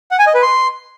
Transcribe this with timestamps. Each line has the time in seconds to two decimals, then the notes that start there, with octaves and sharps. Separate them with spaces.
0.11 F#5
0.19 G#5
0.27 D#5
0.35 B4
0.42 C6